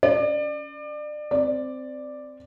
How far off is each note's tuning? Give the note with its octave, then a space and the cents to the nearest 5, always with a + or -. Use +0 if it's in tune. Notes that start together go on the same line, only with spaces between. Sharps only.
C#4 +30 D5 +30
C4 -10 D5 +5